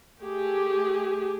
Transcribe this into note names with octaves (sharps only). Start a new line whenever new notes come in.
A3 G4 G#4